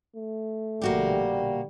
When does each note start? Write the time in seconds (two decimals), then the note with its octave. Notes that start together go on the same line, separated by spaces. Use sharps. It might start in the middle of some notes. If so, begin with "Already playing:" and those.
0.17 A3
0.81 A#1 B2 D3 G3 A#3 F#4 G4